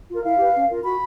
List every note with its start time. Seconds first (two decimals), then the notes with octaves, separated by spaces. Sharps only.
0.09 F4 A#4
0.24 E4 F5
0.39 G4 B4
0.55 C#4
0.69 F4 A#4
0.84 F#4 B5